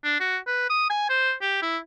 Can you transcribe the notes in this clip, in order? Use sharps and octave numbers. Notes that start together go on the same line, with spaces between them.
D4
F#4
B4
D#6
G#5
C5
G4
E4